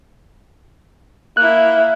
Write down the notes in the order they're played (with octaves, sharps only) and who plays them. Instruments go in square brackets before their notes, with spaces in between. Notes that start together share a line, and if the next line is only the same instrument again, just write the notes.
[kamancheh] A#3 E4 [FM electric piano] F#6